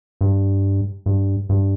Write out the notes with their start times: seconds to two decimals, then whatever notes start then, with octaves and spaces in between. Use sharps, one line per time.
0.21 G2
1.06 G2
1.49 G2